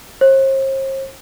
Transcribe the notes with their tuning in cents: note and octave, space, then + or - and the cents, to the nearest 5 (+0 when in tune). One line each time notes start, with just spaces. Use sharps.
C5 +45